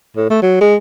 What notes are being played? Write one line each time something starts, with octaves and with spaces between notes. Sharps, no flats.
A2
A3
F#3
G#3